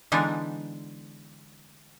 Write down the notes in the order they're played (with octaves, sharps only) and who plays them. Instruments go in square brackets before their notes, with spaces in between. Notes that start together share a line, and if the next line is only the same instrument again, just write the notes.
[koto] D3 E3 G#3 B3 D4 D#4